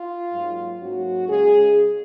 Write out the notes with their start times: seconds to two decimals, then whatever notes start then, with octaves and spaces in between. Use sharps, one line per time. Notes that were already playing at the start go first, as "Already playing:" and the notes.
Already playing: F4
0.32 G#2 F#3 A#3
0.80 G#2 F#3 A#3 C#4 F#4
1.28 C#3 G#3 C#4 G#4